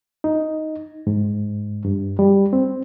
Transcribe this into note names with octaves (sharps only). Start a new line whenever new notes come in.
D#4
G#2
G2
G3
C4